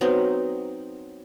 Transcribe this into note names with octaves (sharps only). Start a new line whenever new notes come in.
F#3 B3 C4 D#4